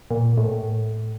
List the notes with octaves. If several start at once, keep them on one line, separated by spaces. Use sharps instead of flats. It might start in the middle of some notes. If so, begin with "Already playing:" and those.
A#2
A2